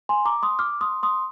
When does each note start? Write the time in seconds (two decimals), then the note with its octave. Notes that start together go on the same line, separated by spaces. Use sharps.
0.09 G#5 C6
0.25 A#5 D6
0.43 C6 D#6
0.59 D6 F6
0.81 C6 D#6
1.03 C6 D#6